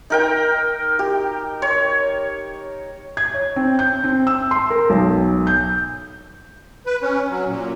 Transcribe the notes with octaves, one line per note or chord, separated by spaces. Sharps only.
D#4 A#4 G5
G4
C#5
G#6
C#5
C4
G6
C4
E6
C6
A#4
B1
G6
B4
C#4
F#3
A#2